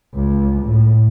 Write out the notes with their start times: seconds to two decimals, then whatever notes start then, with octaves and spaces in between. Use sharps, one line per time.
0.15 C#2
0.63 A2